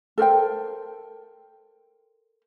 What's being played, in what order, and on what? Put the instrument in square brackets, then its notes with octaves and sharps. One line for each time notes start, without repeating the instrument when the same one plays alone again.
[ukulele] A4 A#4 C5 G5